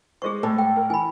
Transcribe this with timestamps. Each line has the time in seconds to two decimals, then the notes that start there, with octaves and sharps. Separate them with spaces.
0.22 G#3 G#4 C5 C#6
0.43 A2 A4
0.58 G5
0.76 A#4
0.90 E3 G#5 B5